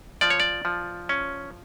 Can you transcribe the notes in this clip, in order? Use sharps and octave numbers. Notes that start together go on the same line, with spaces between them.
F3 D5
C#5
D5
F3
C#4